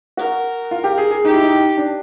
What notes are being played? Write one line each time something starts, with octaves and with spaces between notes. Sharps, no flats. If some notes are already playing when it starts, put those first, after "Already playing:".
F#4 A#4
F4
G4
G#4
G#4
D#4 G4
E4
D#4
D4